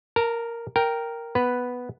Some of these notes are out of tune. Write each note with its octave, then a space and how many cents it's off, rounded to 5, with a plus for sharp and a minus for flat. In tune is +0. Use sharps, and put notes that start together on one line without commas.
A#4 +0 A5 +35
A#4 +0 G5 +0
B3 +0 B4 +0